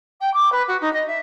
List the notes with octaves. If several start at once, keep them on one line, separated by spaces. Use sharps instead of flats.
G5
D6
B4
F#4
D#4
D#5
E5